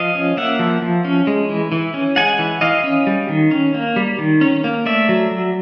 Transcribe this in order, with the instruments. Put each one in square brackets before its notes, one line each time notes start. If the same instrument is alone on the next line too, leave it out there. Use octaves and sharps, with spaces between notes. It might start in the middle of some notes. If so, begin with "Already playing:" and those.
Already playing: [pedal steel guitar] F3 D#5 F5
C#4
A#3 E5 F#5
F3
F3
C#4
G#3
E3
E3
C#4
G#3 F#5 G#5
E3
E3 D#5 F5
C#4
G3
D#3
C#4
A#3
G3
D#3
C#4
A#3
A3 D5 E5
F#3
F#3